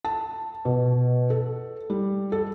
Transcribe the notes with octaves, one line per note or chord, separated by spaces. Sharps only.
A5
B2
A4
G3
A4